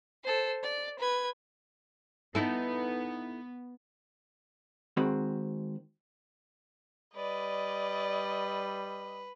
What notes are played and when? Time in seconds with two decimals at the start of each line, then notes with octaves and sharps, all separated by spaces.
0.24 A4 C5
0.62 D5
0.97 B4 G#6
2.35 B3 D#4 E4 A4
4.97 D#3 G#3 C4 F#4 B5
7.16 G3 B4 D5 D#5